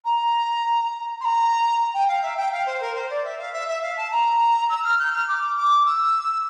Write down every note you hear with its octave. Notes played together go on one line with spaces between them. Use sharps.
A#5
C6
A#5
G5
F5
E5
G5
F5
C5
A#4
C5
D5
E5
F5
E5
E5
F5
A5
A#5
E6
F6
G6
F6
D6
D6
E6